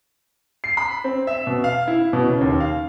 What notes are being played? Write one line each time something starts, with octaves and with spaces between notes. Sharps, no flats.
C7
B5
C4
E5
B2
F5
E4
B2
C#3
D#2
F5